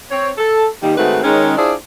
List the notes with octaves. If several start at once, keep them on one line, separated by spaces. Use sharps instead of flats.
C4 C#5
A4
D#2 D#3 G3
G#2 D#3 A3 C4 F#4 B4
D#3 G#3 C#4
D4 E4 F4 G#4 C5 D5